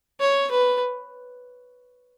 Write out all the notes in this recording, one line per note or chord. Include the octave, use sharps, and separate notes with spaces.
C#5
B4